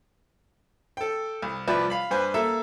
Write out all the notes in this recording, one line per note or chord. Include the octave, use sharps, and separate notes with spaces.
A4 G5
C2
C2 F3 B4 D5 E5
F5 B5
G2 B4 C5 G#5
A#3 A4 E5